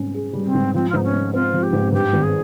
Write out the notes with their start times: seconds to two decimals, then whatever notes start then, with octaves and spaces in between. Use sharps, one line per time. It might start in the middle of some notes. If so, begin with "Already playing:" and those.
Already playing: G#2 G3 C#4
0.14 G#4
0.33 G3
0.44 C4
0.54 G#2
0.74 F3 C4
0.89 F4
0.93 G#2 D#4
1.03 C#4
1.13 G#3
1.34 C4 F4
1.53 F3
1.62 G4
1.73 G#2
1.92 G2 G4
2.13 G#1
2.23 G#4